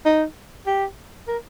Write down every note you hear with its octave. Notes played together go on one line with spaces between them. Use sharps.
D#4
G4
A#4